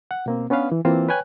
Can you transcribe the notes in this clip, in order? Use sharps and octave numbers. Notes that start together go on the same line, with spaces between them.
F#5
B2 A#3 C4
B3 C#4 D4 B4 F5
E3
E3 A#3 C4 F4 C5
B4 C#5 G5 G#5 F#6